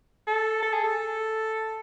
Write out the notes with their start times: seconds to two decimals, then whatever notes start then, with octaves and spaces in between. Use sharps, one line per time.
0.27 A4
0.63 A4
0.74 G#4
0.84 A4